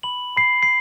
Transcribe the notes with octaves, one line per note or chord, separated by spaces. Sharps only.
B5 F#7
B5 C7
C7